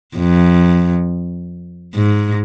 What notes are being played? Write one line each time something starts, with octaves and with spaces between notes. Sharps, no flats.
F2
G#2